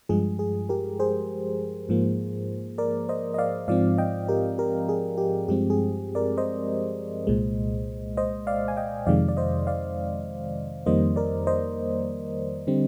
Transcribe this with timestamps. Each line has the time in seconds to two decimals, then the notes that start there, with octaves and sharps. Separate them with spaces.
0.09 G2 F3 G#3 G#4
0.39 G#4
0.69 G4 A#4
1.00 G#4 C5
1.89 G#2 F3 A#3
2.78 A#4 D5
3.09 C5 D#5
3.34 D#5
3.38 D5 F5
3.68 G#2 F3 C4 D5 F5
3.98 D#5 G5
4.28 G4 A#4
4.58 G4 A#4
4.89 G#4
5.18 G4
5.48 G2 F3 G#3 C4 G4
5.70 G#4
6.15 A#4 D5
6.38 C5 D#5
7.27 C2 A#2 G#3
8.17 C5 D#5
8.47 D5 F5
8.68 G#5
8.77 D#5 G5
9.06 F2 C3 D#3 G#3 D5 F5
9.28 D5
9.37 C5 D#5
9.67 D5 F5
10.86 F2 D#3 G3 A#3 C5 D#5
11.16 A#4 D5
11.47 C5 D#5
12.67 D3 G3 C4